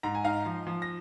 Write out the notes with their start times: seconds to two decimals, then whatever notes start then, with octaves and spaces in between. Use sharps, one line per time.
0.03 G#2 A#5
0.15 G#5
0.24 D#4 F5 A#5
0.46 F3
0.67 F3
0.82 A#6